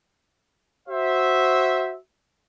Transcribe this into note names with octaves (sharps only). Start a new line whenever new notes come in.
F#4 C5 E5